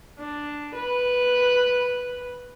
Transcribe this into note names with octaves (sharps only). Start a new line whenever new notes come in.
D4
B4